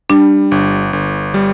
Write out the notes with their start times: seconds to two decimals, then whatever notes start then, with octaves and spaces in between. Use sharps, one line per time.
0.10 G3 D4
0.51 G1
0.93 G1
1.34 G3